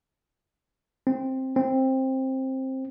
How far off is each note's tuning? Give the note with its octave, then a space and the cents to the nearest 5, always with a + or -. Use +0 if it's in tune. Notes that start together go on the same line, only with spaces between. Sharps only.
C4 +10
C4 +15